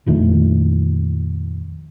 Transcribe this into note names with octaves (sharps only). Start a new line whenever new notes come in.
A#1 F2 D#3 A3